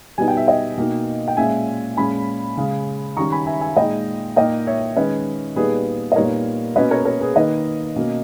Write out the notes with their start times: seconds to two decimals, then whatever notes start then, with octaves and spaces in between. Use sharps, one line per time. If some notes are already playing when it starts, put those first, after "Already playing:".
0.18 B2 G3 B3 D#4 G#5
0.28 G5
0.37 E5
0.47 D#5 G5
0.77 B2 A#3 D#4
1.28 G5
1.37 A#2 G#3 C#4 E5 G#5
1.97 A#2 G#3 C#4 G#5 B5
2.57 C#3 G#3 C#4
3.17 D#3 G3 C#4 A#5 C#6
3.32 G#5 B5
3.46 E5 G#5
3.61 E5 G#5
3.76 A#2 G#3 D#4 D#5 G5
4.36 A#2 A#3 D#4 D#5 G5
4.67 C#5 E5
4.96 D#3 G#3 C#4 B4 D#5
5.56 A#2 G3 B3 D#4 G#4 B4
6.12 D#5
6.16 A#2 G3 B3 D#4 A#4 C#5
6.76 B2 A#3 C#4 B4 D#5
6.91 A#4 C#5
7.05 A#4 C#5
7.21 G#4 B4
7.35 D#3 A#3 D#4 B4 D#5
7.96 B2 A#3 C#4